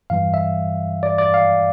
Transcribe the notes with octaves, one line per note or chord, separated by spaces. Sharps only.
G2 E3 G3 F5
E5
D5
D5
F5